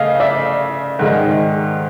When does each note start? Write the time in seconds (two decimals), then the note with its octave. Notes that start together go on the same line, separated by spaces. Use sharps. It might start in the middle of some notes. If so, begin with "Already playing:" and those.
Already playing: C#3 A3 D#5 F5
0.20 D5 E5
0.99 G#2 D#3 G#3